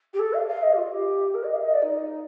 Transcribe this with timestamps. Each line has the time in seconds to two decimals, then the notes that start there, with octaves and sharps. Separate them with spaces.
0.13 G4
0.19 A4
0.33 F5
0.48 F5
0.62 D#5
0.73 G4
0.77 F4
0.91 G4
1.34 A#4
1.44 D#5
1.54 F5
1.63 D#5
1.73 D5
1.83 D#4